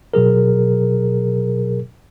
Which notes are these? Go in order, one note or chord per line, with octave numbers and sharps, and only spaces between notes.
B2 F#3 G#4 A#4